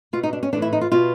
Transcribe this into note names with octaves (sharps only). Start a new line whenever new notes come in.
B2 F4
D#4
D4
C#4
A2 E3 D4
E4
D#4
F4
B2 F4